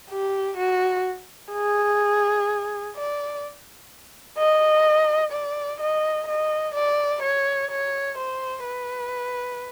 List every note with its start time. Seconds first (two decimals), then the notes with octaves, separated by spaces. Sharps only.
0.10 G4
0.58 F#4
1.53 G#4
2.96 D5
4.38 D#5
5.32 D5
5.80 D#5
6.28 D#5
6.75 D5
7.22 C#5
7.71 C#5
8.18 C5
8.65 B4